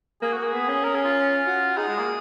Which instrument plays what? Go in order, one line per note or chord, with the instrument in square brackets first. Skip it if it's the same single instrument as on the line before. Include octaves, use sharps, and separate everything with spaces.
[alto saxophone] A#3 [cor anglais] G#4
[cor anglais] F#4
[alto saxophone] A#3 [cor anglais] G#4
[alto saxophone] B3
C#4
[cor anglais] A#4
G#4
F4
[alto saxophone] F#4
[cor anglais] D#4 [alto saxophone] G#4
[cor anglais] G#3
A#3